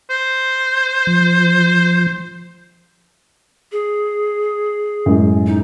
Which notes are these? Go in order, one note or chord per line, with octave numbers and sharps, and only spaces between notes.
C5
F3
G#4
F#2 A2 G#3
D#4